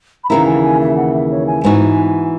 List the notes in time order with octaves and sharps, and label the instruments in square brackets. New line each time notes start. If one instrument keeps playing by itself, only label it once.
[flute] B5
[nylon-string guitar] D#2 C#3 E3 A#3 E4 [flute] A#5
[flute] G#5
G#5
E5
F#5
E5
C#5
G#5
[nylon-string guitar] G#2 E3 B3 D#4 F#4 [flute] G#5